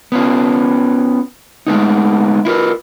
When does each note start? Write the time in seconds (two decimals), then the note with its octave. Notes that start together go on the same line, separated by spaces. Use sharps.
0.12 B3 C#4 F4
1.67 G#3 A3 B3 D#4
2.45 E4 F4 A#4 B4